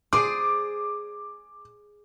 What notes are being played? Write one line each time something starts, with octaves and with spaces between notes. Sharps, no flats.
G#4 C5 D5 D6